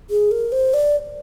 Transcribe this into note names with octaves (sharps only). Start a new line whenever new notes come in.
G#4
A#4
C5
D5